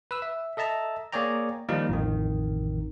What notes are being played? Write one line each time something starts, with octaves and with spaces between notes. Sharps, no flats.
B4 E6
E5
A4 D#5 E5 A5 A#5
A#3 G#4 C#5 D5 G5 A#5
D#3 F3 G3 A#3 D#4 A#4
A1 F2 D#3